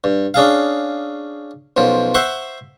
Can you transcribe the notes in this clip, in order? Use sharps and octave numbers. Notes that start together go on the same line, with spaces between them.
G2
C#4 D4 G#4 F5
B1 F#2 F3
C5 E5 F#5 C6 C#6